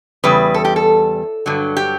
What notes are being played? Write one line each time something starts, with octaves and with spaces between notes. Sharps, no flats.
E2 C#3 G3 B4
A4
G4
A4
G2 D3 F#3
G4